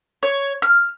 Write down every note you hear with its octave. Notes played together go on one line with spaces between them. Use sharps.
C#5
F6